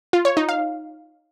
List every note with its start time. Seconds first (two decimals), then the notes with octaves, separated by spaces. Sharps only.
0.13 F4
0.25 C#5
0.37 D#4
0.49 F5